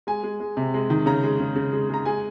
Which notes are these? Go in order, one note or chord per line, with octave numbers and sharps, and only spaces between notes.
G#3 G#5
G#3
G#3
C3
G#3
D#3
C#3 A#5
G#3
C#3
C#3
G#3
G#3 A#5
G#3 G#5